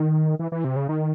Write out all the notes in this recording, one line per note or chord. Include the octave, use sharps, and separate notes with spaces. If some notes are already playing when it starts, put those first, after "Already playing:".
Already playing: D#3
E3
E3
C3
C#3
D#3